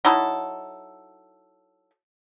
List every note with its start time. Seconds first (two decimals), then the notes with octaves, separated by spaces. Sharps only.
0.05 F#3 D#4 E4 A4